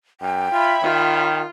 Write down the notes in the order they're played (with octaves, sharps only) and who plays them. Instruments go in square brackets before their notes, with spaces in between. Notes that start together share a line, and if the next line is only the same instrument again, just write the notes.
[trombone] F#2 [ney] G5
[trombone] F4 [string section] C#5 E5 B5
[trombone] D#3 [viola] F4